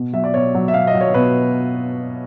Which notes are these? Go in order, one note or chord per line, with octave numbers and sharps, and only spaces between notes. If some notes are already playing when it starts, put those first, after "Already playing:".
Already playing: B2
F#3 E5
D5
B2 C#5
F#3
E5
B2 F5
D#5
F#3
C#5
B2 B4